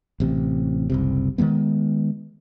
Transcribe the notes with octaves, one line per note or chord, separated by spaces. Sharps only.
A1 C3
F#1 C2 C3
D#3 E3 G#3 B3